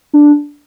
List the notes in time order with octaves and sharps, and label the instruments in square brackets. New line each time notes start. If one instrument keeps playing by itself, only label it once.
[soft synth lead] D4